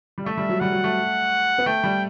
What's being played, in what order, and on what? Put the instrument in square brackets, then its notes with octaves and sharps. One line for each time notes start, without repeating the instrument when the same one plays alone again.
[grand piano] G3
[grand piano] A3 [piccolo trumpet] E5
[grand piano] G3
F#3
[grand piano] G3 [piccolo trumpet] F#5
[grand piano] F#3
A3
B3
[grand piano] A3 [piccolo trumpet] G5
[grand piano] G3